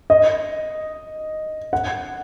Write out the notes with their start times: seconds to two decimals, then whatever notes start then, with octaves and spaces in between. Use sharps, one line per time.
0.10 D#5
1.73 F#5